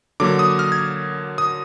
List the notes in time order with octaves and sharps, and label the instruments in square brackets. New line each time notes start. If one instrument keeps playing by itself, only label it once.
[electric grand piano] D3 F#3 A#3 D6
D#6
F6
G#6
D#6